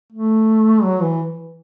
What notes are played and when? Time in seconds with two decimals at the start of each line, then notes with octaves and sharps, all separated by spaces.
0.12 A3
0.84 F#3
1.02 E3